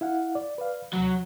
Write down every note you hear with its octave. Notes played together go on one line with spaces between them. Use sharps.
E4 F5 F#5
D5
B4 D5 F5
D#2 C3 F#3